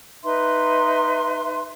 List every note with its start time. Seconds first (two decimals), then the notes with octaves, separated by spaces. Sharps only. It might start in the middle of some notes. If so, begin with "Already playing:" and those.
0.24 D#4 B4 E5 C6